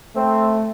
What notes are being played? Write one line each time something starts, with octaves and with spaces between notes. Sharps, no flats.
A3 C4